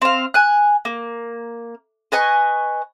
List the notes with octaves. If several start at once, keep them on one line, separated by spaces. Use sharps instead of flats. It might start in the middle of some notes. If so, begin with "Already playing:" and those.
C4 F5
G#5 F#6
A#3
B4 D#5 G#5 C#6